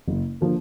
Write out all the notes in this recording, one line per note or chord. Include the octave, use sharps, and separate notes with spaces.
F#1
D3 F3 A#3